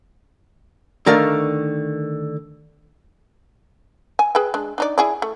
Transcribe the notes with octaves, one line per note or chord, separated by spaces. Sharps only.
D3 D#3 A3 A#4 D5 F5
G#5
G#4 B4 G5
G#3 D4
D4 D#4 D5
E4 G#4 D5
A3